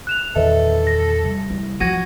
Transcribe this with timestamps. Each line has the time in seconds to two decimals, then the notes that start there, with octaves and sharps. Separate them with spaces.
0.07 F#6 E7 F7
0.36 E2 A#2 D#3 A4 B4 D#5 E5
0.87 A#6
1.23 C3 G3
1.50 E4
1.80 F3 F#4 G#6 A#6 D#7